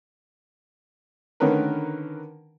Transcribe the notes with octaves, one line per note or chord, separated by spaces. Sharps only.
D3 D#3 C#4 A#4 B4